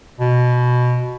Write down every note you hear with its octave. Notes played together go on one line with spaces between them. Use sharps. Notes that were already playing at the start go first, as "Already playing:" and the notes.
B2